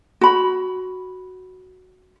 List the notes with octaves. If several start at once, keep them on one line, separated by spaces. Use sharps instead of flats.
F#4 B5